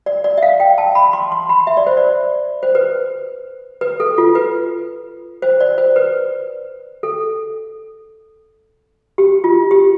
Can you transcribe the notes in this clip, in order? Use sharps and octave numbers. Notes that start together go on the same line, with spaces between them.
D5
D5
E5
F5
G5
A5
B5
C6
C6
B5
E5
D5
C5
D5
C5
B4
B4
A4
F4
B4
C5
D5
C5
B4
A4
G4
F4
G4